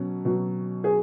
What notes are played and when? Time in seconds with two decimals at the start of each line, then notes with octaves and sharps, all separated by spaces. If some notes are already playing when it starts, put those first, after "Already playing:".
Already playing: B2 F#3 C#4
0.25 B2 F#3
0.84 G#4